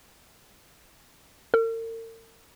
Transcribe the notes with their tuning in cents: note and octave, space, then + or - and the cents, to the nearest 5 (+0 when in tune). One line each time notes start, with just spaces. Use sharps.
A#4 -45